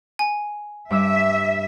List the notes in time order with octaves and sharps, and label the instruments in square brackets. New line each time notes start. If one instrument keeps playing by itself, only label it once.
[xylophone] G#5
[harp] G2 D6 E6 [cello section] E5